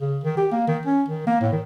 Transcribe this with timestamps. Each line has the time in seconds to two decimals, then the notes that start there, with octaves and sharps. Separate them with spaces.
0.01 C#3
0.24 D#3
0.37 G4
0.52 A#3
0.67 D#3
0.85 C#4
1.08 D#3
1.26 A#3
1.41 A2
1.52 D#3